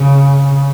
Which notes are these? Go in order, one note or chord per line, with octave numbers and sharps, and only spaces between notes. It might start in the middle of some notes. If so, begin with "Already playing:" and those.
Already playing: C#3